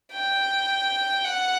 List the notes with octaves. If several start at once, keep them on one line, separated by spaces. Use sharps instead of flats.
G5
F#5